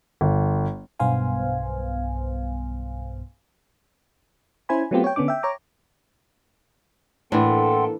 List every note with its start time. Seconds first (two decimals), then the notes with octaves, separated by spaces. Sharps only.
0.21 G1
1.00 B1 G2 B3 C5 F5 G#5
4.69 C#4 E4 C5 G#5 B5
4.91 F#3 A3 B3 C4 F4 G4
5.04 C#5 G5
5.16 D3 B3 C#4 D4 D6
5.28 E5 G5
5.43 C#5 A#5 D6
7.32 A2 E3 A#3 D4 A4 F#5 G5 C6